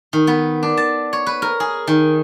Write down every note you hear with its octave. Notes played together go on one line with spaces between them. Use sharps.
D#3
B3
D4
A5
C#5
B4
A#4
G#4
D#3